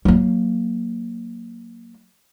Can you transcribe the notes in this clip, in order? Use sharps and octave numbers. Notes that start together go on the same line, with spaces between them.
F#3 A#3